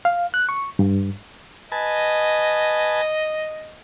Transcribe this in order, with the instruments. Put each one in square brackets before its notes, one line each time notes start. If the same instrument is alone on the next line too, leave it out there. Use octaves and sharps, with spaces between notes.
[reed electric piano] F5
F#6
C#6
G2
[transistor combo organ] B4 G#5 A5 [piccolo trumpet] D#5